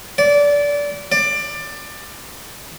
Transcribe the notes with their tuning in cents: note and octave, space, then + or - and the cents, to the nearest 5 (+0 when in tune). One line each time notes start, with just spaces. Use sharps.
D5 -20
D5 +20